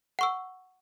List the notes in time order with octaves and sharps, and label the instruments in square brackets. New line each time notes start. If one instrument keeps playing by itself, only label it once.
[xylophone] F#5 C#6 E6